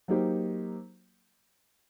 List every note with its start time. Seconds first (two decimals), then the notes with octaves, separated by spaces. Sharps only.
0.08 F#3 A#3 D#4 G4 C5